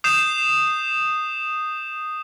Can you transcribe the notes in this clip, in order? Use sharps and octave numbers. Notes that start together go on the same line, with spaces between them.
D#6 G6 C7 E7